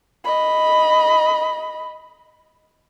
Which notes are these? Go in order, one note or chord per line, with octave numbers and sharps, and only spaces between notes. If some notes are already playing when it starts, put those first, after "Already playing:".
D#5 B5